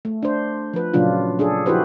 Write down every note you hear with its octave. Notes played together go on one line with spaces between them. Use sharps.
A3
D4 C5
F3 B4
A#2 C#3 F#3 D4 F4
D4 G#4 A4
F3 E4 F#4 G4 B4 C5